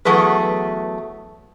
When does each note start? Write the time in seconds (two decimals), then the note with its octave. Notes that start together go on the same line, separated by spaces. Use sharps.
0.05 E2 F#3 A3 G#4 B4